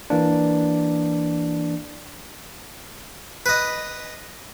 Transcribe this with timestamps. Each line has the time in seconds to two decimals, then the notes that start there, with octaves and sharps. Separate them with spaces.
0.10 E3 A#3 D4
3.46 B4 D#5